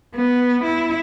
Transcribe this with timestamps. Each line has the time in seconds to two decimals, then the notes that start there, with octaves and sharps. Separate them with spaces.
0.15 B3
0.64 E4